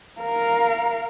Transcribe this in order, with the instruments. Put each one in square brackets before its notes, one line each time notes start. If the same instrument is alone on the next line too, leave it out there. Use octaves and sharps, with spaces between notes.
[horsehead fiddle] A#4 F5